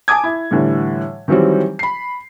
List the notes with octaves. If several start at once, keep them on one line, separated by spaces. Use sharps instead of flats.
G#5 A5 D6 D#6 G#6
E4
A2 D3 E3 G3
D#3 E3 F#3 G3 C4
B5 C7